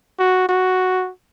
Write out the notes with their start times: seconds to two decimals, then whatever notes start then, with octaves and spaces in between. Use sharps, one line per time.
0.19 F#4
0.49 F#4